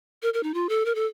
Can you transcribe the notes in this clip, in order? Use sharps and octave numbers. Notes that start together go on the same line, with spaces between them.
A#4
A#4
D#4
F4
A4
A#4
A4